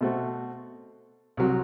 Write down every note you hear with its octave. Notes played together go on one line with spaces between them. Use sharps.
B2 A3 C4 F#4
C2 C3 F#3